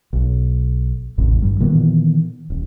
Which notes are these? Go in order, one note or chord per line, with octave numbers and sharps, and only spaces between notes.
B1
A1 E2 A2 C3
G#1 G2 G3
A#2 D#3 E3 B3
D#1